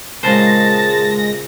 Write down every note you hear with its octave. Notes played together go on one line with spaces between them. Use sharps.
A#2 C#3 G#3 C5 A5 A#6